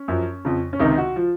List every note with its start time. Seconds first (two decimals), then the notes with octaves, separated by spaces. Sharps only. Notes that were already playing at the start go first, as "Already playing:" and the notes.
Already playing: C#4
0.08 F#2 F3
0.45 F2 C#3 F3
0.73 C#4
0.79 C#2 C3 D#3 D#4
0.98 F#4
1.16 F3 F4